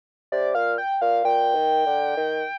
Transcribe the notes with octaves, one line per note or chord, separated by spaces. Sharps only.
C3 D5
A#2 F5
G5
A#2 F5
A#2 G5
D#3
D3
D#3